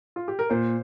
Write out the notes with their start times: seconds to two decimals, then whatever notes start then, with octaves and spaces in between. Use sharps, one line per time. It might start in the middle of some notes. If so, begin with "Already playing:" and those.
0.16 F4
0.28 G4
0.39 A#4
0.50 A#2 C5